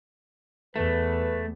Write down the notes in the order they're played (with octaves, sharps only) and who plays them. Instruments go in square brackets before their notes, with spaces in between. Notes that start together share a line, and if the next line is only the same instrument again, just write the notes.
[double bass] E2 [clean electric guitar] A3 [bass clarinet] B4